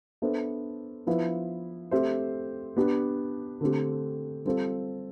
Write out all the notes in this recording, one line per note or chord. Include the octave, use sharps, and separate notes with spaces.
B3 D4 A4 C5 E5
F3 B3 E4 B4 E5
A3 C4 G4 C5 E5
B3 D4 G4
D3 A3 C4 G4
G3 C4 F4 A4 C5